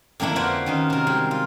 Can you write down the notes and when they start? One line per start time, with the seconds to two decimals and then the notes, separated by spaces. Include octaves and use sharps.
0.20 F2 D3 A#3 D4 E4
0.36 F4 F#4 B4 C5 D5 F5
0.66 D#3 C#4 D#4
0.90 C3 A#4
1.07 G3 G#3
1.31 F4